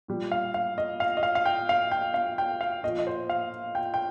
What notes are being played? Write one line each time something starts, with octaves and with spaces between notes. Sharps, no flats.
A#2 G3
F5
F5
D#5
F5
D#5
F5
F5
G5
F5
G5
F5
G5
F5
A#2 F3 D#5
D#5
C5
F5
G5
G5